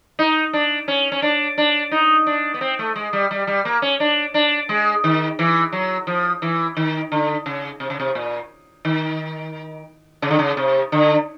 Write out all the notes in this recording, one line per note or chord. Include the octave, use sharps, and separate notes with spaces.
D#4
D4
C#4
C#4
D4
D4
D#4
D4
B3
C4
A3
G#3
G3
G3
G3
A#3
C#4
D4
D4
G#3
D#3
E3
F#3
F3
E3
D#3
D3
C#3
C3
C#3
C3
A#2
D#3
C#3
D3
C#3
C3
D3